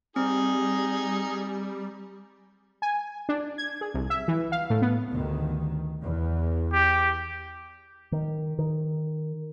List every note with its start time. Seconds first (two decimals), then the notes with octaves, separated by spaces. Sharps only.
0.16 G3 C4 D#4 G#4
2.82 G#5
3.29 D4
3.58 G#6
3.81 G#4
3.94 C2
4.10 E5
4.28 E3
4.52 F5
4.70 A2
4.82 B3
5.11 D2 G2 D#3
6.02 E2
6.73 G4
8.12 D#3
8.59 D#3